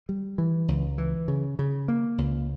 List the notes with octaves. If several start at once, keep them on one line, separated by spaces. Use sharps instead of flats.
G3
E3
C#2
E3
C#3
C#3
A#3
C#2